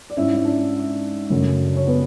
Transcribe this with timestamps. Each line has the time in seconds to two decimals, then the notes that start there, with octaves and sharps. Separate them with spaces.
0.10 D5
0.17 G#2 G#3 C#4 E4 E5
0.35 E5
0.45 D4 D5
1.30 F#2 C#3 F#3 A3 C#4
1.77 C#5
1.87 B3 B4